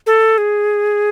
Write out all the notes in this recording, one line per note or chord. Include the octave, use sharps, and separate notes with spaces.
A4
G#4